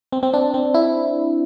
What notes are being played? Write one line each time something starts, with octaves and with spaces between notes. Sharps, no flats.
C4
C4
D4
C4
E4